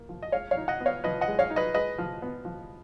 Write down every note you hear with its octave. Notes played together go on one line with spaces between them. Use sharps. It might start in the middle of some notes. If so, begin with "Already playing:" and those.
Already playing: A#3
F3
D#5
G#3 C#5 F5
C#5 F5
D#4
D#5 F#5
B3
C#5 F5
F3 B4 D#5
D#5 F#5
G#3
C#5 F5
D#4
B4 D#5
G#3 B4 D#5
F3
B3
F3